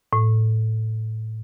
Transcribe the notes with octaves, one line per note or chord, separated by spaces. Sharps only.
A2